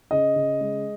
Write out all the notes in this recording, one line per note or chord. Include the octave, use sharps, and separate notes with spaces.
C#3 D#5
C#3
G#3